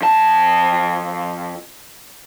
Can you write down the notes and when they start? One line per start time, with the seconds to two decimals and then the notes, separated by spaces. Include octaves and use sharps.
0.02 F2 A5